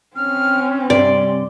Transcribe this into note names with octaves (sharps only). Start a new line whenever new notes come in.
C4 C#4 F6
G2 C3 D5 C6